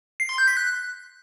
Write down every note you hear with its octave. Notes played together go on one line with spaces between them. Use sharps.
C7
C6
G6
B6
F#6